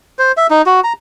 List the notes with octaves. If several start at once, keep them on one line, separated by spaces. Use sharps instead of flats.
C5
E5
D#4
F#4
A#5